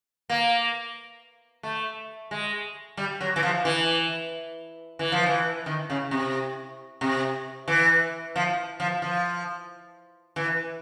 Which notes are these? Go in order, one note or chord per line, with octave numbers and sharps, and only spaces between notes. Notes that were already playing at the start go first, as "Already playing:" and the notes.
A#3
A3
G#3
G3
F#3
E3
F3
E3
E3
F3
E3
D#3
C#3
C3
C3
E3
F3
F3
F3
E3